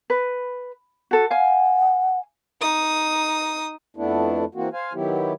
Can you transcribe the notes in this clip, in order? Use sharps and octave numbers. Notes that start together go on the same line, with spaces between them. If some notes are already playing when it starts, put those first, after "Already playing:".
B4
F#4 A4
F5 F#5 G#5
D#4 D#6
F2 A3 B3 D4 E4
E3 A#3 C4 F#4
C5 F5 G#5
D#3 F#3 B3 E4 G4